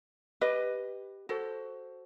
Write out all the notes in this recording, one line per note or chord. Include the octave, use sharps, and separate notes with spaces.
G4 B4 D#5
F#4 A4 C5